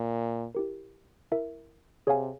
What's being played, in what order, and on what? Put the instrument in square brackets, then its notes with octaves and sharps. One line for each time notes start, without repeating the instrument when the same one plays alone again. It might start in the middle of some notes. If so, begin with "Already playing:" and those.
Already playing: [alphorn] A#2
[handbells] E4 G4 A#4
E4 A#4 E5
[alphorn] C3 [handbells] G#4 C#5 F5 G#5